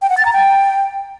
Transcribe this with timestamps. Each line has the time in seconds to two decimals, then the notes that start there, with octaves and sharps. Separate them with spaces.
0.02 G5
0.10 F#5
0.17 A6
0.25 A#5
0.33 G5